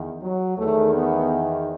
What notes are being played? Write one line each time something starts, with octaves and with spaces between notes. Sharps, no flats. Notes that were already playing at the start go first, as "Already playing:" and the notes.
Already playing: E2 D#3
F#3
E2 D#3 A3
B3